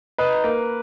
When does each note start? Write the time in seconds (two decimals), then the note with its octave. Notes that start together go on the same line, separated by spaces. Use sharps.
0.18 D#4 B4
0.44 A#3